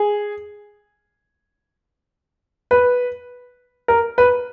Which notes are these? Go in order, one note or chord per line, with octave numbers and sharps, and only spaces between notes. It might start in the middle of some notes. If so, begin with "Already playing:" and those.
Already playing: G#4
B4
A#4
B4